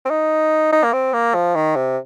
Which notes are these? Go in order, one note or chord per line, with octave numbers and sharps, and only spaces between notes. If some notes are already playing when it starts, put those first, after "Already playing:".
C4
D#4
D#4
A#3
C4
A#3
F3
D#3
C3